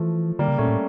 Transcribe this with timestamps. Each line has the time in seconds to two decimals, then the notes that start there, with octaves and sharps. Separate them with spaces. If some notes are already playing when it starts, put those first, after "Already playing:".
Already playing: E3 F3 A3
0.39 D3 G3 A#3
0.48 C#3
0.58 A#2 A3 C#4
0.68 A2